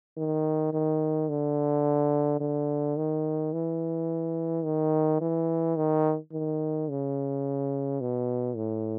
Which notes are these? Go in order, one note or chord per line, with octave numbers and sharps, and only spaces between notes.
D#3
D#3
D3
D3
D#3
E3
D#3
E3
D#3
D#3
C#3
B2
A2